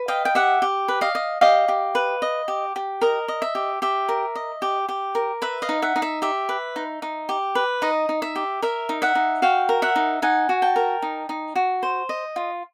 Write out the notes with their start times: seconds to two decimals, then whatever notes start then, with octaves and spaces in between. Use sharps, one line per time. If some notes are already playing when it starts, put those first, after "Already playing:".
Already playing: B4
0.08 D#5 F5 G5
0.25 G5
0.35 G4 E5 F#5
0.62 G4
0.88 B4
1.01 D#5 F5
1.15 D#5
1.41 G4 D#5 F5
1.68 G4
1.95 B4
2.22 D#5
2.48 G4
2.76 G4
3.01 A#4 D#5
3.28 D#5
3.42 E5
3.55 G4
3.82 G4 E5
4.09 A#4
4.35 D#5
4.62 G4
4.89 G4
5.15 A#4
5.42 B4 E5
5.62 D#5 F5
5.69 D#4
5.82 E5 F#5
5.96 D#4
6.02 E5
6.22 G4 E5
6.49 B4
6.76 D#4
7.02 D#4
7.29 G4
7.55 B4
7.82 D#4 D#5
8.09 D#4
8.22 E5
8.36 G4
8.62 A#4 E5
8.89 D#4
9.02 E5 F#5
9.15 D#4
9.42 F#4 F5 G5
9.69 A#4
9.82 E5 F#5
9.96 D#4
10.22 D#4 F#5 G#5
10.49 F#4
10.62 G5 A5
10.76 A#4
11.02 D#4
11.29 D#4
11.55 F#4
11.83 C5
12.09 D#5
12.36 F4